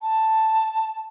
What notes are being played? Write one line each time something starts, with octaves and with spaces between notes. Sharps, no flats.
A5